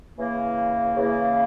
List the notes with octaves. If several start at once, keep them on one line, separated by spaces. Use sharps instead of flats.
C#3 E3 A#3
C#3 E3 A#3